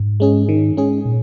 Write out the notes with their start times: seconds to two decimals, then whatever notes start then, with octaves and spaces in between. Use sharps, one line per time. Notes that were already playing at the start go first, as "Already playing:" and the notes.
Already playing: G#2
0.20 G#3 C#4 G#4
0.49 D#3
0.77 G#3 C#4 G#4
1.05 A#2